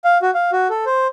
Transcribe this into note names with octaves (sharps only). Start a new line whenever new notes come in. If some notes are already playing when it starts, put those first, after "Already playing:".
F5
F#4
F5
F#4
A4
C5